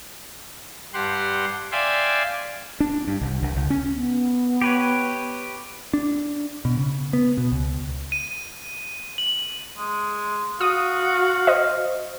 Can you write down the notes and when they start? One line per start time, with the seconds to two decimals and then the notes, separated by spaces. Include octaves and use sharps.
0.94 G2 G4 F#5 C6
1.72 D5 E5 F5 G5 G#5 C6
2.80 D4
3.07 G2
3.21 C2
3.42 C2
3.56 C#2
3.70 C#4
3.94 B3
4.61 G4 B4 C#5
5.93 D4
6.65 B2
6.77 C#3
7.13 B3
7.38 B2
7.52 C#2
8.12 D#7
9.18 F#7
9.78 G#3
10.61 F#4 F5 D#6
11.47 C5 D#5